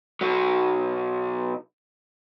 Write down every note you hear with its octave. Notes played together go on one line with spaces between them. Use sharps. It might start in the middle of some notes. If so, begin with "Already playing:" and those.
B1 F#3